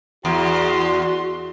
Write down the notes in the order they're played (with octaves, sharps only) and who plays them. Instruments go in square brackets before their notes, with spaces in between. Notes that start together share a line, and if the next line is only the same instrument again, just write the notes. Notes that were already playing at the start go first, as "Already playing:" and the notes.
[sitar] E2 [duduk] F#4 [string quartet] C6